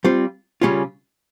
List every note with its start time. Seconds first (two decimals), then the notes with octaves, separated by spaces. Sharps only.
0.04 G3 C4 F4
0.61 C#3 G3 C#4 F4